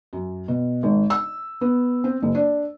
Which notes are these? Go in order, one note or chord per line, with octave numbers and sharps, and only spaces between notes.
F#2
B2
G#1
E6
B3
C4
F#1
D4